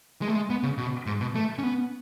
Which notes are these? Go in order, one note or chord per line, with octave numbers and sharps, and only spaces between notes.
G#3
A3
G#3
B3
C#3
B2
G#2
B2
A3
C#4
B3